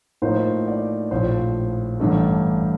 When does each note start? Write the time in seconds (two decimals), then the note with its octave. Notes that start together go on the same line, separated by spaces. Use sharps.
0.22 A2 F3 A#3 D#4 C5
0.67 D5
1.11 A#1 A2 F3 C5
2.00 A1 G2 D3 A3